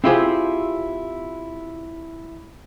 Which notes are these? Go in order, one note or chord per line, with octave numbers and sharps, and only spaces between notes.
C4 E4 F4 G4 G#4 C5